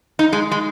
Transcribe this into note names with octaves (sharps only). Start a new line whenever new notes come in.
D#4
G#3
G#3